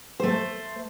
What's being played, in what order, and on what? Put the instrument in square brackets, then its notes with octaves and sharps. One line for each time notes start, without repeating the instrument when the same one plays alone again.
[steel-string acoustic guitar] A3 C5